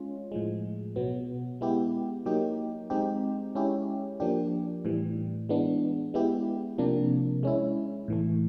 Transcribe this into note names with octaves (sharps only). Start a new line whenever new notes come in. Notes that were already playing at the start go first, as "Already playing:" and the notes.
Already playing: G#3 C#4 F4
A2 F3 G#3
B2 F#3 B3
G#3 B3 E4 G4
F#3 A#3 D#4 G4
G#3 C4 D#4 G4
G#3 C#4 E4 G4
F3 A#3 D4 G4
A2 E3 G3
E3 G#3 B3 D4
G#3 B3 E4 G4
C3 F3 A#3 D4
G#3 C#4 E4
A2 E3 A3